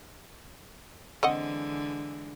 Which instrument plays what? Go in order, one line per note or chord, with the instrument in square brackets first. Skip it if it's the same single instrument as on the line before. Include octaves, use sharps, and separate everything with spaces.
[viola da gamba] D3 E3 G#3 [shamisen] C4 D#5 F#5